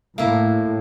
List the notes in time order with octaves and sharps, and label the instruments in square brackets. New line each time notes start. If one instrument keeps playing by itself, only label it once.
[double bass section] A2 [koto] A#3 E4